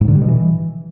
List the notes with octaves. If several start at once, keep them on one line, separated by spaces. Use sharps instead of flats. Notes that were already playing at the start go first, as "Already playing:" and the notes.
G#2
D3
G3
B2
E3